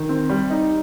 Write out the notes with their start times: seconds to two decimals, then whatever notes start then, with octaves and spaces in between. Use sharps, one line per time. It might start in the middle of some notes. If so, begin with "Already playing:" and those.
Already playing: D#3
0.09 C4
0.30 G3
0.50 D#4